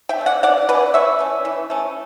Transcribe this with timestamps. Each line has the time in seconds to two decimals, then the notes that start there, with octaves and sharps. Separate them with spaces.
0.09 E5 G5
0.18 A3
0.21 C#4
0.26 D5 F#5
0.43 E3 D5 F#5
0.69 A3 C#4 B4 D5
0.94 E3 C#5 E5
1.19 A3 C#4
1.45 E3
1.70 A3 C#4